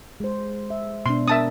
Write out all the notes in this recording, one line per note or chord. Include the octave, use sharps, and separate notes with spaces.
G#3 C5
E5
B2 D4 C6
D4 A#4 E5 A5 D#6